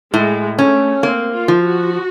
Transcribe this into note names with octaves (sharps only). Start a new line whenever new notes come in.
A2 G#3
A3 C#4
A#3 C4
F4
F3
F#4